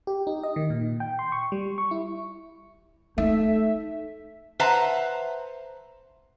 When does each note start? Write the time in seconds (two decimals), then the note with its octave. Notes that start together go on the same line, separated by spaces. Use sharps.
0.07 G4
0.27 D#4
0.43 D#5
0.56 D#3
0.70 A#2
1.00 G5
1.19 C6
1.32 C#6
1.52 G3
1.78 C#6
1.91 E4
3.18 A3 D#4 E5
4.60 B4 C5 E5 F#5 A5 A#5